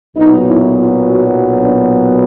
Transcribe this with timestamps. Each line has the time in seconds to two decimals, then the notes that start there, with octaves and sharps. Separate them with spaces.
0.15 B1 A#2 F#3 B3 D#4
0.47 E4
0.78 F4
1.09 F#4
1.57 D4